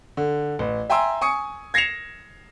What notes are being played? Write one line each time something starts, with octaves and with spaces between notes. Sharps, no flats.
D3
A1
E5 G5 G#5 A#5 C6 E6
G#5 C#6 D#6 C#7
G#6 A#6 C7 C#7 E7 F7